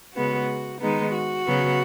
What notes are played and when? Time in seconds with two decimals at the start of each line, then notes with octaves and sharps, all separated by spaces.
0.16 C#3 G#3 B3 F#4
0.81 D#3 G#3 B3 D#4
1.14 F#4
1.47 C#3 F#3 B3